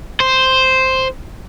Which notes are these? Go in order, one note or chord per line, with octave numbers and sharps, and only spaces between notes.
C5